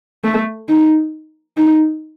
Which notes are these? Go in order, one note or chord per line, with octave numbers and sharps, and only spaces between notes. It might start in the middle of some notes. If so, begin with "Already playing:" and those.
A3
D#4
D#4